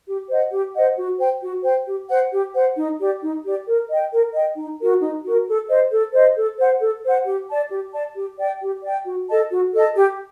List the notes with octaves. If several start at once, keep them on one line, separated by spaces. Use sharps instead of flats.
G4
C5 D#5 F#5
G4
C5 D#5 F#5
F#4
C5 G5
F#4
C5 G5
G4
C5 F#5
G4
C5 F#5
D#4
G4 D5
D#4
G4 D5
A#4
D#5 G5
A#4
D#5 G5
D#4
F#4 A#4
D#4
F#4 A#4
A4
C5 D#5
A4
C5 D#5
A4
C5 F#5
A4
C5 F#5
G4
D5 A5
G4
D5 A5
G4
D5 G5
G4
D5 G5
F#4
A4 D#5 A5
F#4
A4 D#5 A5
G4